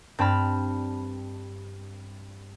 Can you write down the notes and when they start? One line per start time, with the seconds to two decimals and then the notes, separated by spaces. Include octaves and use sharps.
0.19 G2 C4 A5 B5 F6